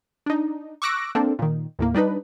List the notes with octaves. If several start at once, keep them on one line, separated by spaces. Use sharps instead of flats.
D4 D#4
C#6 D6 E6 F#6 A#6 D7
A#3 C4 D4 A4
A#2 D#3
D#2 A2 A#3
G3 D4 D#4 B4